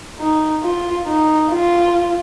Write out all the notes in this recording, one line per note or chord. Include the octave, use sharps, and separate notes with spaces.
D#4
F4
D#4
F4